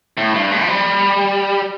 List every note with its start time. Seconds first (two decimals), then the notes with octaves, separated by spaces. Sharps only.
0.17 A2
0.34 G2
0.51 A2
0.61 F3
0.68 G3